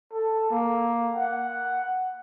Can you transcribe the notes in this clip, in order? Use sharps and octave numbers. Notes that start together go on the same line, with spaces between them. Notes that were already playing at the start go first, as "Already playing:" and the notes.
A4
A#3
F#5